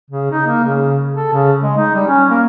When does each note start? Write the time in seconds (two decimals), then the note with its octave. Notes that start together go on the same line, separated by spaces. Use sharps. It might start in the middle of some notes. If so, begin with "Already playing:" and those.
0.10 C#3
0.31 D#4
0.47 A#3
0.63 C#3
1.14 A4
1.33 C#3
1.63 G#3
1.77 D#4
1.95 G3
2.07 C#4
2.30 A#3